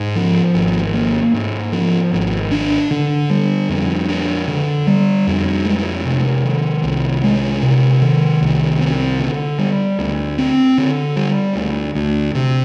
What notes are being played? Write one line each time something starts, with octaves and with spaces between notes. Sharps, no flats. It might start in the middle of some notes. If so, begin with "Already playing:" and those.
Already playing: G#2
F3
G#1
A#3
G#2
F3
G#1
D4
D3
G3
F2
D4
D3
G3
F2
G#3
C3
D#3
C2
G#3
C3
D#3
C2
C4
D3
G3
D2
C4
D3
G3
D2
D2
C3